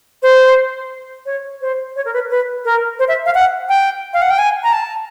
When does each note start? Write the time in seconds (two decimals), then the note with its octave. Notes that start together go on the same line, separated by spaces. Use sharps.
0.23 C5
1.26 C#5
1.61 C5
1.96 C#5
2.05 A#4
2.13 B4
2.30 B4
2.65 A#4
2.99 C5
3.08 E5
3.26 F5
3.35 F#5
3.69 G5
4.14 F5
4.22 F#5
4.30 G5
4.39 G#5
4.63 A#5
4.73 A5